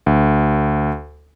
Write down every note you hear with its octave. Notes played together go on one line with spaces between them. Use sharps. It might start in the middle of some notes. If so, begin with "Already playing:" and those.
D2